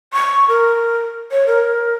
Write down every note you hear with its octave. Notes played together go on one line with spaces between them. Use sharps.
C#6
A#4
C#5
A#4